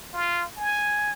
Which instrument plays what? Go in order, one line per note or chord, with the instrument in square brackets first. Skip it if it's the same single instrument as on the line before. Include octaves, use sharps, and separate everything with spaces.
[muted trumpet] F4
G#5